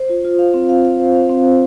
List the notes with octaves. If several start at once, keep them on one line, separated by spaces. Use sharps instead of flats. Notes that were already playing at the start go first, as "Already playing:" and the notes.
Already playing: C5
F4
F4
F5
C4
F5
F5
C5
F5
C4
C5